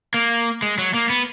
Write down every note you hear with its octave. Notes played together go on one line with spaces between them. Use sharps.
A#3
G#3
F#3
A#3
B3